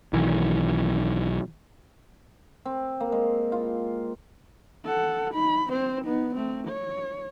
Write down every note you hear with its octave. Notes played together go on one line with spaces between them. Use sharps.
B1 D#3 E3
C4
A#3
G#3
F4
A4 F#5
D#4 B5
C4 C5
B3 D#4
A3 C4
C#5